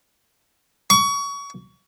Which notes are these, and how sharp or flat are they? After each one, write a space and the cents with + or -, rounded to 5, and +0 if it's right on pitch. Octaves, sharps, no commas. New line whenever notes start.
C#6 +25